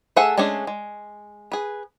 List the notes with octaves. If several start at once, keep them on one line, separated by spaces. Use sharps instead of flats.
A3 G#4 A4 E5 F#5
G#3 A3 C#4 D4 G#4
G#3
G#4 B4